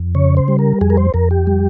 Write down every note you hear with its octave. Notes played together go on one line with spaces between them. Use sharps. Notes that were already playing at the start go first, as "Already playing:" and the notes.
Already playing: F2
C#3 C#5
C5
G3
A#4
F2 G#4
A#4
C5
F2 A#4
G4
G3